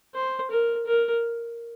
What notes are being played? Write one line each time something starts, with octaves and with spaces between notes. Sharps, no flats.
C5
A#4
A#4